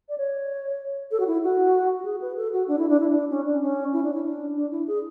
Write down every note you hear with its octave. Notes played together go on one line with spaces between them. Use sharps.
D5
C#5
A4
F#4
E4
F#4
F#4
G#4
B4
A4
F#4
D4
E4
D4
E4
D4
C#4
D4
C#4
E4
D4
E4
D4
D4
E4
G#4